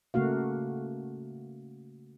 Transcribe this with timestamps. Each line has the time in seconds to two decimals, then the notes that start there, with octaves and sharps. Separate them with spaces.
0.14 C#3 A3 A#3 F#4 F5